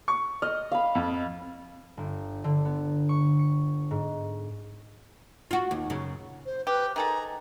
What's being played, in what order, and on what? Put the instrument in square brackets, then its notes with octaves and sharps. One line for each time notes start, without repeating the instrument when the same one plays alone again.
[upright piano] C#6
[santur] D#5 [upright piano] F6
[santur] F5 B5
[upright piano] F2
[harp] G1
D3
B3
C#6
C#7
G#2
[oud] F4 F#4
D#2
F#2 C#3
[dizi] C5
[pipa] G4 [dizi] B4
[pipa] D#3 G#4 A4 [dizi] A#5